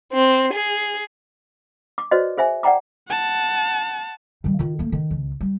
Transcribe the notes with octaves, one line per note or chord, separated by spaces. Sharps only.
C4
G#4
D6
F#4 B4 C5 D5 D#5
G#4 C5 E5 G#5
D5 F#5 G5 A#5 D6
F#5 A5
D#3 G3
D#3 F4
A3 A#3
D#3
C#2
G3